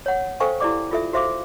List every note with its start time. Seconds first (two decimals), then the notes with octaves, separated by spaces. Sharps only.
0.06 C#5 F#5
0.40 A4 C5 F5 G5 G#5 C#6
0.60 E4 G4 D5 D6
0.91 F4 A4 E5
1.13 F#4 C5 E5 F5 D6